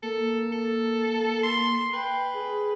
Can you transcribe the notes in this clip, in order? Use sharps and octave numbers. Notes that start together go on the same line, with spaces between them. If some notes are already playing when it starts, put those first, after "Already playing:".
A#3 A4
A4
C6
B4 G5
G#4